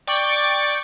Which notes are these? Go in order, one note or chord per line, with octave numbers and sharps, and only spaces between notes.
D5 G5 C#6 D6